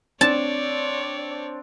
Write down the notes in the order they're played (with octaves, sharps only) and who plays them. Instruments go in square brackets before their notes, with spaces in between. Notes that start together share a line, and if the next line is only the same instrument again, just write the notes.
[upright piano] C4 D4 [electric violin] C#5 D5 [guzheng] A5